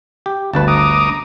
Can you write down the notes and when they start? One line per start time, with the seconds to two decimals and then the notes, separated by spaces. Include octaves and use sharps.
0.26 G4
0.53 G1 D2 B4 A5
0.68 A#5 D6 D#6